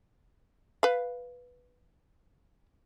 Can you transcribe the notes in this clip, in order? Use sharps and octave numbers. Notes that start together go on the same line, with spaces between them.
B4 F5